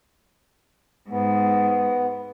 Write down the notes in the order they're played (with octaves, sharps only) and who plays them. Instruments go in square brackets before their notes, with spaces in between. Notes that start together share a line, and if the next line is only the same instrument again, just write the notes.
[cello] G#2 [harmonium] B3